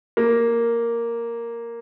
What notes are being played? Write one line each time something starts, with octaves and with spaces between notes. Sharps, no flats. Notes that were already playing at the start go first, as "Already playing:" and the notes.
A#3